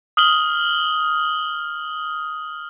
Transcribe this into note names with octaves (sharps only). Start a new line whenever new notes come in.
D#6 F6 F#7 G7